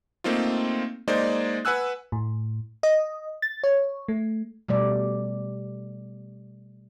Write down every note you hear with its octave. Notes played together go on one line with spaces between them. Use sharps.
A3 A#3 C4 D#4 F4
G#3 A#3 D#4 C5 D5
B4 F#5 G#5 E6 F#6
A2
D#5
A6
C#5
A3
B2 G3 A3 D5